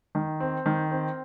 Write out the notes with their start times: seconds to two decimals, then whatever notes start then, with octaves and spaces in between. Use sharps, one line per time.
0.15 D#3
0.40 C4
0.66 D#3
0.91 C4